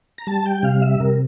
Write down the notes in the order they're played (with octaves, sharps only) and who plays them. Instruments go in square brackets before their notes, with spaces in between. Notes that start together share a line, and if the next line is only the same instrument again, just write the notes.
[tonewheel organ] A#5
G3 A5
G5
C3 F5
E5
C3 A#4